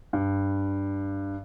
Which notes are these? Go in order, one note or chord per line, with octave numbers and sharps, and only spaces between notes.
G2